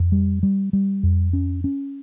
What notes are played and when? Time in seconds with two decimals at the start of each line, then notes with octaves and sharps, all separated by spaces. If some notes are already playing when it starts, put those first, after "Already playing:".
Already playing: F2
0.12 G3
0.43 G3
0.73 G3
1.03 F2
1.33 C#4
1.64 C#4